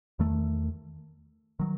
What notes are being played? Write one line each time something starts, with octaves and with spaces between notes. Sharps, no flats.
E2 D#3 A3
D#3 F#3